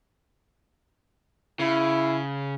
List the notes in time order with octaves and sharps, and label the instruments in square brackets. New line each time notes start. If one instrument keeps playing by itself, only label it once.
[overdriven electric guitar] C#3 [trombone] E4